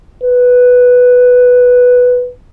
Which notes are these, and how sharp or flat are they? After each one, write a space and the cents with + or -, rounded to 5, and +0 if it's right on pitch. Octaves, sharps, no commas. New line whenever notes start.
B4 +0